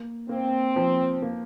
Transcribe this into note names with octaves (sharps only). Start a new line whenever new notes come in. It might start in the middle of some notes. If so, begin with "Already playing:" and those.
Already playing: A#3
A#3 C4
F3
A#3